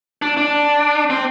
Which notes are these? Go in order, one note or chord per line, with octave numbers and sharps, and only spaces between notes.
D4
D4
C4